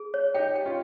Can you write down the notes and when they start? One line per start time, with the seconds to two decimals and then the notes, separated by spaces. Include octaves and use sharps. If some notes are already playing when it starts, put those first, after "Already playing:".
Already playing: G#4
0.14 C#5
0.34 D#4 G4 G5
0.56 G5
0.66 C#4 F4